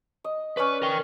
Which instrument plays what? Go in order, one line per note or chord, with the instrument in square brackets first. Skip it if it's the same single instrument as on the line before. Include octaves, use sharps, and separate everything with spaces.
[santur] D#5
[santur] C#4 C#5 D5 [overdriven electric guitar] B4
[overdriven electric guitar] A#4 G5